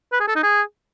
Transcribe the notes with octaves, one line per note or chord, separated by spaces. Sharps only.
B4
G#4
A4
D#4
G#4